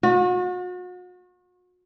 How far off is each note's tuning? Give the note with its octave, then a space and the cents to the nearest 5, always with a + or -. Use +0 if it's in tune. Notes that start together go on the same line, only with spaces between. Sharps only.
F#4 -40